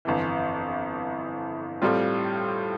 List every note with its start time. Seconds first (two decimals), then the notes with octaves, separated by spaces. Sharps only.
0.05 G1 F2 E3
1.82 A2 G3 C4 F4